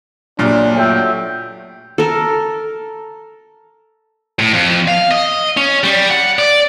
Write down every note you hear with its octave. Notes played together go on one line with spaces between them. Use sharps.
F#1 A#2 F#3 D4 G4
A3 F4 F#4 C#5 E5 G5
A4 A#4
A2
F2
F5
D#5
C#4
G3
F#5
D5